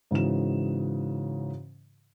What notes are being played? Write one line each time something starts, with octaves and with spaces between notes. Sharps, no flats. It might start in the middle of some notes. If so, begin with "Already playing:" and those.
G#2 C#3 E3 F#4 E7